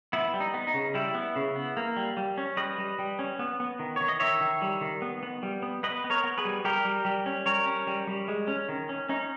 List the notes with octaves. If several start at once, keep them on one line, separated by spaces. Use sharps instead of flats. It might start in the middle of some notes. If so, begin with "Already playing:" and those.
B3 E4
G3
D#4
B3
D#4
C#3
G3 E4
B3
C#3
B3
A#3
G3
G3
C#4
G3 B4 D#5
G3
G3
C#4
B3
B3
D#3
D#3 C#5
D#5
D#3 C#5 E5
D#3
G3
D#3
B3
B3
G3
B3
B3 B4 D#5
B3
A#4 C#5
B3
G#4 B4
G3
G3 G4 A#4
G3
G3
C#4
G3 A#4 C#5
C#4
G3
G3
G#3
C#4
D#3
C#4
C#4 D#4